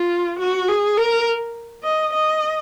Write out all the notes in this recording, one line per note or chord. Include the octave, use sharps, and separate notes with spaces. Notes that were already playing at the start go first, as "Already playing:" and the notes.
Already playing: F4
F#4
G#4
A#4
D#5
D#5